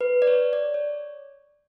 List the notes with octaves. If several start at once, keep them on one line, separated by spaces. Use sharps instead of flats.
B4
D5
C#5
D5
C#5